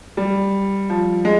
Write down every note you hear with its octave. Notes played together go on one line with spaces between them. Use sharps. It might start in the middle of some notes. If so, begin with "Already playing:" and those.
G3
F3
G#3